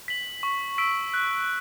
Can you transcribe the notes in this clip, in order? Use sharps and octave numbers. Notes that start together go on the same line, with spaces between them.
B6 F#7
C#6
E6 B6 D7
F#6